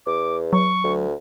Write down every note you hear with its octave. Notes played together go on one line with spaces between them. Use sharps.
E2 D6
F#3 C#6
D2